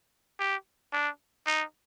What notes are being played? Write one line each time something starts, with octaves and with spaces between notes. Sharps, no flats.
G4
D4
D#4